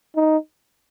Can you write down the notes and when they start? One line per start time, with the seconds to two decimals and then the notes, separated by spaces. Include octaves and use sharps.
0.16 D#4